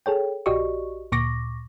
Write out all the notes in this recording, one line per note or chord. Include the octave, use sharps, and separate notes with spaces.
G#4 A4 C#5 G5
A#1 F#4 G4 D5 D#5 C#6
D2 A#2 C#6 D6 A#6